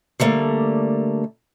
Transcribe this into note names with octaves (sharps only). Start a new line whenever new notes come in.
D3 G3 A3 A#3